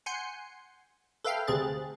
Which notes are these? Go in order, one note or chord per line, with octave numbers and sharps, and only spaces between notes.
F#5 G#5 C6 G6 C7 C#7
A4 B4 E5 F5 G5 F6
D2 C3 C4 G#4 F#6 A6